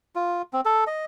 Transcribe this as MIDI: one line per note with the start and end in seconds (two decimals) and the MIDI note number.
0.15 0.42 65
0.53 0.61 60
0.65 0.84 69
0.87 1.05 75